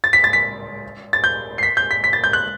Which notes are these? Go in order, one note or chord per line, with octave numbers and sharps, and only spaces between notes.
A6
B6
A6
B6
A6
G6
C7
B6
G6
B6
B6
A6
G6
F#6